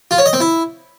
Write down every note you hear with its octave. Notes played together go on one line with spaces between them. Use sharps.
F4
C#5
D#5
C4
E4